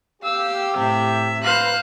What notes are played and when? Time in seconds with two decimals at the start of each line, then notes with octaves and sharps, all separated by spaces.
0.22 G4 F5 E6
0.77 A2 C3 E5
1.44 B4 C5 F5 A#5 F#6